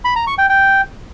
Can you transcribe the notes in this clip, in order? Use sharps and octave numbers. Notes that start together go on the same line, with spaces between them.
B5
A#5
C#6
G5
G5